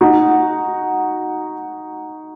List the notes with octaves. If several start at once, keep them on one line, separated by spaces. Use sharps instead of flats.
D#4 F#4